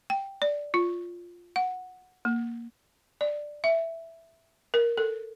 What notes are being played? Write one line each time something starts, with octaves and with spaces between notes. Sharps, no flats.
G5
D5
F4
F#5
A#3
D5
E5
A#4
A4